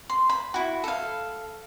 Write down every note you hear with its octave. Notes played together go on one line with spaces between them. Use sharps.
C6
B5
E4 F#4
A4 F5